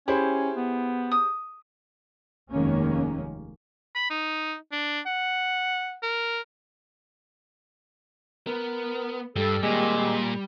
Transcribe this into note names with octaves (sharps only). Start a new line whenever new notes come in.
C#4 E4 G4 G#4 C5
B3
D#6
F1 D#2 D#3 G#3 A#3 C#4
B5
D#4
D4
F#5
A#4
B3 A#4
G2 G3 A4
A#2 D#3 G#3 C4 G4